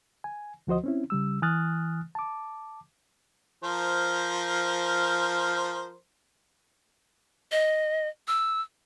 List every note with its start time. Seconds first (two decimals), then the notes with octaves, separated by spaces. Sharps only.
0.24 G#5
0.67 D2 F3 F#4 C5 D#5
0.84 C4 C#4 E4
1.10 C#3 G3 E6
1.42 E3 G#5 D#6 F6 F#6 A6
2.15 A5 D6
3.64 F3 A#4 C5
7.52 D#5
8.28 E6